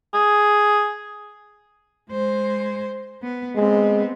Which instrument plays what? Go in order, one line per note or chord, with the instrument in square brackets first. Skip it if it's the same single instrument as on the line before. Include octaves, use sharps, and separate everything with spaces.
[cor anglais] G#4
[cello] G#3 C5
B3
[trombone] G#3 [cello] B3 C4